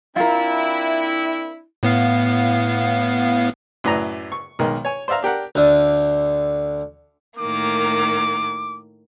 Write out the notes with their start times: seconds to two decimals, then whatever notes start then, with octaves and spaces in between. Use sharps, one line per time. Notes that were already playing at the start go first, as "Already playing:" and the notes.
0.16 C4 D4 E4 F4 A#4
1.83 A2 B3 F5
3.84 F#2 A2 B4 D5 A#5
4.32 C#6
4.59 B1 D#3 G#3
4.85 C#5 G#5
5.08 C5 D5 E5 F5 A#5
5.23 D4 G4 A#4 F#5
5.55 D2 D3
7.39 A2 D#3 A#3 D6